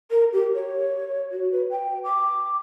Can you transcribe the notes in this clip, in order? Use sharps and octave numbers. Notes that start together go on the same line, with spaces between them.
A#4
G4
C#5
F#4
B4
G5
D6